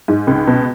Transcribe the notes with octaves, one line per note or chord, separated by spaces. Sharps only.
G#2
C#2
B2